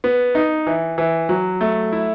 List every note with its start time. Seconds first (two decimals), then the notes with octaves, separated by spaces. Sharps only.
0.04 B3
0.35 D#4
0.67 E3
0.98 E3
1.29 F#3
1.61 A3
1.93 E4